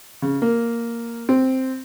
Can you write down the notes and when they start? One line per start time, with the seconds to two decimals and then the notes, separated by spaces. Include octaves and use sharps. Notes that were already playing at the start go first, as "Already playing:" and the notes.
0.22 C#3
0.42 A#3
1.29 C4